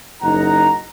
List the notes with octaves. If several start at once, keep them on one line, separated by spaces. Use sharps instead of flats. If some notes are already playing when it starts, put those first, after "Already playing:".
F#1 D#4 F#5 A#5